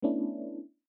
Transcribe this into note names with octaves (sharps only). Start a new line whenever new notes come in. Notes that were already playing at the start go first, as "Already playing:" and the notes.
A3 B3 C#4 D4 E4